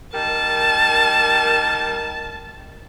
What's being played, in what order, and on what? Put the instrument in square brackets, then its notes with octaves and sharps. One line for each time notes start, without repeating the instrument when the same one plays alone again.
[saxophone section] G3 D#4 A#4 [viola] A5